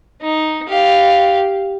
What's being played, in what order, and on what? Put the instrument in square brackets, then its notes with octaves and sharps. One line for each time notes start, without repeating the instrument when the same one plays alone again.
[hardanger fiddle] D#4
G4 F5